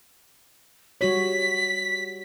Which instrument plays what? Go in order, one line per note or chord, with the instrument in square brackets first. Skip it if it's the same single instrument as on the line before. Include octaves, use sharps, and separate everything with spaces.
[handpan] G3 F#4 C#5 [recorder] B6